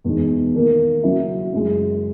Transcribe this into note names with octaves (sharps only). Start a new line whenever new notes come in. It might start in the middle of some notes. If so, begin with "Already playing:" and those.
E2 B2 G#3 D#4
D#3 A#3 D#4 A#4
C#3 F#3 C#4 E4
F#2 C#3 G#3